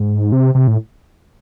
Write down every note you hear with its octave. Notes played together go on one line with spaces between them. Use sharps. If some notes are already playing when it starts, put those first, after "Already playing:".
Already playing: G#2
C3
C3
A2